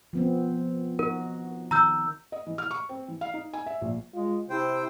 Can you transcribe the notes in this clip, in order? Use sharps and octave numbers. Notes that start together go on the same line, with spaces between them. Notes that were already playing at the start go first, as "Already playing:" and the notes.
F3 B3 C4
D#4 F#4 A#4
D#3 A#5 E6 G6
D#5
E3
F6
C#6
C4
E3
F5
D#4
G#5
E5
A#1
G#3 F4
C3 E4 C5 G5